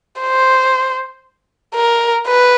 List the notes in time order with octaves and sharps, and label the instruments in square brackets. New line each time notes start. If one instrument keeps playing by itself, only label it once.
[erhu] C5
A#4
B4